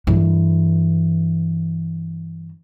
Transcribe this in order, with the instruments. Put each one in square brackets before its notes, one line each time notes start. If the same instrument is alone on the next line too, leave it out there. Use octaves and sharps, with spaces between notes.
[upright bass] G2 E3